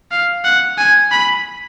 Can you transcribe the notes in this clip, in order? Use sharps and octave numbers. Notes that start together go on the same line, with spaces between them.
F5
F#5
G#5
B5